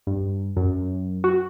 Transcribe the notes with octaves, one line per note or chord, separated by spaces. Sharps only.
G2
F#2
F#4